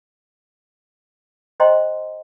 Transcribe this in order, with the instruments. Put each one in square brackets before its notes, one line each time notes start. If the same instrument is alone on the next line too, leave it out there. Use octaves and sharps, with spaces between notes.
[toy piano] C5 D#5 G5 A#5 C6